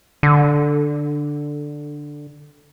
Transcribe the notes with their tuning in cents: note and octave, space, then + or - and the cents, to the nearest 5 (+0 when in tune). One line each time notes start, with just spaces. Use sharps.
D3 +5